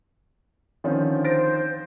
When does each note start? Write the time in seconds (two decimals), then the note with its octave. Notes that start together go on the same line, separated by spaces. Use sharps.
0.84 D3 D#3 F3 C4 C#4 C#5
1.24 C5 A6 A#6 D7